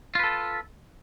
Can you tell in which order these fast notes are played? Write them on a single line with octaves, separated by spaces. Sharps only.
F4 B4 A4